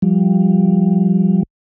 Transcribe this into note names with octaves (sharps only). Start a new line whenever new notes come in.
F3 G3